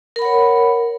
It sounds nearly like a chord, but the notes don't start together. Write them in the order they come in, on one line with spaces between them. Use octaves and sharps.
A#4 B5 F#5 C#5